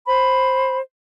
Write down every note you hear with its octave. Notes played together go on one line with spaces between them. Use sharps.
C5 B5